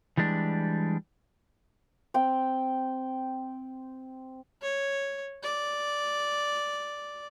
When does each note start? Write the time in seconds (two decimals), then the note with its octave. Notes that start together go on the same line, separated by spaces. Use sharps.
0.17 E3 G3 G#3 D4
2.14 C4 G5
4.62 C#5
5.43 D5